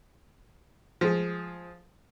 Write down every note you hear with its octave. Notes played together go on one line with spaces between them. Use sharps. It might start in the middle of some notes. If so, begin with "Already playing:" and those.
F3 G#3 G#4